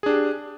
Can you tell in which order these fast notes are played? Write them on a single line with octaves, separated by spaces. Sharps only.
G#4 D4 G4